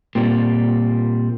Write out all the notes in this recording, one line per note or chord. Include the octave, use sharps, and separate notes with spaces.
A#2 G3 C4